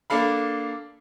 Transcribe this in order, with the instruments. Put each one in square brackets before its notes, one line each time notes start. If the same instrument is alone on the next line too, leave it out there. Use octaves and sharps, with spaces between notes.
[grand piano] A#3 D4 A4 F5 B5